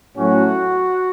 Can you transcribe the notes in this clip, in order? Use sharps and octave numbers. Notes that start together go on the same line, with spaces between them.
A2 F#3 C#4 F#4